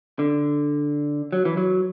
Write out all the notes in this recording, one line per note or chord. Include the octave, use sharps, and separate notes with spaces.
D3
F#3
E3
F#3